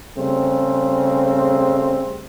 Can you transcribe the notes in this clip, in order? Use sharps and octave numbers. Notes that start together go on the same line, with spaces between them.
C#3 G3 A3 C4